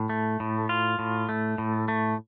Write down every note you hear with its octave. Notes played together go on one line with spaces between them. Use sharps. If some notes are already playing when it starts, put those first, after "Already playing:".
Already playing: A2
A3
A2
F4
A2
A3
A2
A3